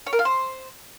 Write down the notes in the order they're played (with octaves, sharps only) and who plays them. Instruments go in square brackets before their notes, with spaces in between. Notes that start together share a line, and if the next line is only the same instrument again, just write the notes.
[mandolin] C#5
A#4
F4
C5